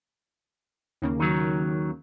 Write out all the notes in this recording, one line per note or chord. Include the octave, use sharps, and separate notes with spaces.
D#2 C#3 A#3
D#3 F#3